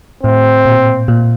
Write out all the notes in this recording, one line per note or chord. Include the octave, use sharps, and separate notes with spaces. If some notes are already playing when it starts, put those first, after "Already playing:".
A2 C4
A#2
A#2